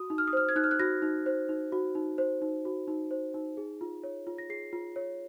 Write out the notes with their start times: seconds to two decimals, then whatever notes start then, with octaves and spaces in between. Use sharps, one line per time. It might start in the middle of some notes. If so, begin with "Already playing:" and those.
Already playing: F#4 D#6
0.10 D#4
0.18 F6
0.27 D#6
0.33 C5 F6
0.49 G#6
0.56 D#4 F#6
0.64 F6
0.71 F#6
0.80 F#4 A#6
1.02 D#4
1.26 C5
1.49 D#4
1.72 F#4
1.95 D#4
2.18 C5
2.42 D#4
2.65 F#4
2.88 D#4
3.11 C5
3.34 D#4
3.57 G#4
3.81 F4
4.04 C#5
4.27 F4
4.38 A#6
4.49 G#4 C7
4.73 F4
4.96 C#5